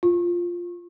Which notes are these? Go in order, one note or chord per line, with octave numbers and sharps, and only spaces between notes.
F4